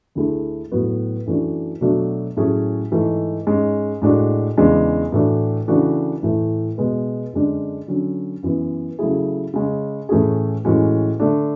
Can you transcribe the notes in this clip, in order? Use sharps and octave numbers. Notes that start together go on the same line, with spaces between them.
D2 D3 A3 E4 G#4
A2 F#3 B3 F#4
F#2 E3 A3 D4 F#4
B2 F#3 A3 D4 F#4
A2 F#3 A3 C#4 G#4
G#2 E3 A3
G#2 G#3 C#4
A2 G#3 D4 F#4
E2 C#3 E3 G#3 D4
A2 E3 A3 D4 F#4
C#3 E3 A3 D4 F#4
A2 E3 A3
B2 G#3 B3
F#2 D3 G#3 D4
D3 F#3 C#4
F#2 E3 B3
C#3 F#3 A3 E4 G#4
C#3 G#3 C#4
A2 E3 A3 C#4 G#4
A2 E3 G#3 C#4 F#4
D3 A3 D4